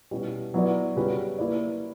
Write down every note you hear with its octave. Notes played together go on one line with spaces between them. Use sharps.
B2 G3 C#4 E4
F#3 B3 E4 B4 D5
C#3 G3 C#4 F#4 B4
A#3 E4 B4 D5